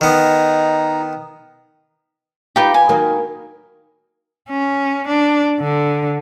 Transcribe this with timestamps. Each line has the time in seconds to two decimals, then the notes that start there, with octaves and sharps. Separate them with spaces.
0.01 D#3 B3 D#4 A#5
2.56 D#4 F4 G4 B4
2.74 G#5
2.89 D#3 F#3 A#3
4.49 C#4
5.08 D4
5.61 D3